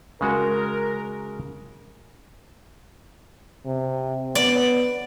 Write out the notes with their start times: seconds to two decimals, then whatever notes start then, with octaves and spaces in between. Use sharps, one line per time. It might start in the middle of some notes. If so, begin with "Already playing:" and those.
0.21 C#3 G#3 F#4 A#4
3.65 C3
4.35 B3 D5